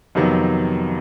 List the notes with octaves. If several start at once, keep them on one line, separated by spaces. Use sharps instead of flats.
F2 C3 D#3 F#3 B3